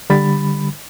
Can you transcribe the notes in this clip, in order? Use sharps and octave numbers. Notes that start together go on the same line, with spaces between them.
D3 G3 B5 A6